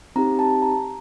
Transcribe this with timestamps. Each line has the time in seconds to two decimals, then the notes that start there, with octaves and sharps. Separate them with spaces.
0.16 C4 D#4 G4 A#5
0.39 A5
0.62 A#5